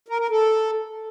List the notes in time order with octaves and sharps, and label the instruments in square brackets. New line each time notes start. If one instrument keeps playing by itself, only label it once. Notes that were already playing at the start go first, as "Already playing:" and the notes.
[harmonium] A#4
A#4
A4